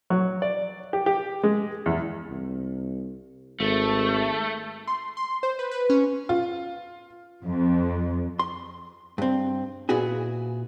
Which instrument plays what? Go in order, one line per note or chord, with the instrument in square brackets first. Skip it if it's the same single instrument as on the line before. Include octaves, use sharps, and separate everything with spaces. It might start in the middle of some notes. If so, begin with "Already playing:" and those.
[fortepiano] F#3
D5
G4
G4
G#3
E2
[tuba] C2
[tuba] G#1 [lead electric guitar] A3
[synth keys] C6
C6
C5
B4
B4
C#4
[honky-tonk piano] F4
[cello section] F2
[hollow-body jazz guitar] C6
G2 C4
A#2 B3 E4 F#4 G#4